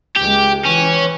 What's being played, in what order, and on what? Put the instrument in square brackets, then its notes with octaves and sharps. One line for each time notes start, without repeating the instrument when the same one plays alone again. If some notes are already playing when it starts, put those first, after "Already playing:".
[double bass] C#2 G#3 [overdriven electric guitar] G4
[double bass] E3 [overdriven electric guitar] C#4